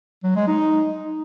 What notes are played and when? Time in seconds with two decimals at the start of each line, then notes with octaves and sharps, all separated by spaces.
0.24 F#3
0.36 G#3
0.48 D#4